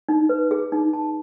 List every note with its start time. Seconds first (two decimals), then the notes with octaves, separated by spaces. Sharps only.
0.09 D#4
0.29 B4
0.51 G#4
0.72 D#4
0.93 A5